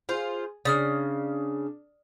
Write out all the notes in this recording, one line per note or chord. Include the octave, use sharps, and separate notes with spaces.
F4 G#4 C5
C#3 D4 D5 D#6 F6